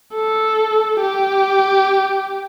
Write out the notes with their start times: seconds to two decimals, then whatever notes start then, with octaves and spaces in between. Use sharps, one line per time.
0.14 A4
1.01 G4